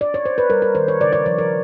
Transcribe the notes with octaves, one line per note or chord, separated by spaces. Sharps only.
D5
C#5
C5
B4
G3 A#4
A#4
D#3 C5
C#5
C#3 D5
D5
F3 C#5
A#4